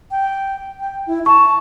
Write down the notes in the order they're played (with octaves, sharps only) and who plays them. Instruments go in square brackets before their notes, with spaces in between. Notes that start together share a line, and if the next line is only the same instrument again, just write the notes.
[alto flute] G5
G5
E4
[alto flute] A5 [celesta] C#6